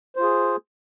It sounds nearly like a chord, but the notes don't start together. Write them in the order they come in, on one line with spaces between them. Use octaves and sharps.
C5 F4 G#4